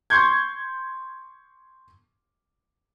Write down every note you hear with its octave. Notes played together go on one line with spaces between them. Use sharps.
C6 C#6 G6 G#6